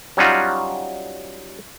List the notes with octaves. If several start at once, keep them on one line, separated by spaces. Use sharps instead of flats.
F#3 G3 C#4 D#4 F4 F#4